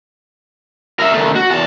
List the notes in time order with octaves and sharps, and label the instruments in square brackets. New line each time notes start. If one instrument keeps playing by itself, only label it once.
[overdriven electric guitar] A#4 E5
D#3 A3
F#4
E2 A5